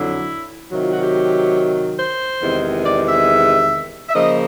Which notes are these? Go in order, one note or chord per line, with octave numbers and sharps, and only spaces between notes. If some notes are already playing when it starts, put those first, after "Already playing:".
Already playing: F2 D3 F#3 E4
C3 D#3 F#3
F4
F#4
G4
C5
E2 C3 D#3 G#3
D5
E5
E5
C#3 F3 A#3 D#5